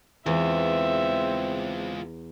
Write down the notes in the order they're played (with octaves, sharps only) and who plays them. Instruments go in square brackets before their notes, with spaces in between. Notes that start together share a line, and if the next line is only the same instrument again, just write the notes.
[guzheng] E2 [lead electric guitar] G#3 F4 [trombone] C4 [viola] E5